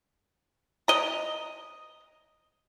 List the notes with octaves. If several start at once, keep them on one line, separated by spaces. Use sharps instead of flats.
D#5 A#5